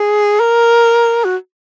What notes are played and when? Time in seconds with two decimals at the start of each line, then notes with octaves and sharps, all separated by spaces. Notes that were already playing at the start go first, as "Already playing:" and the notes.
Already playing: G#4
0.40 A#4
1.24 F#4